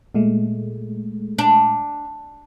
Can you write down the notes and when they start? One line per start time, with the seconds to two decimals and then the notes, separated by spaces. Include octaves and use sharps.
0.15 A#2 G#3 A3
1.39 D4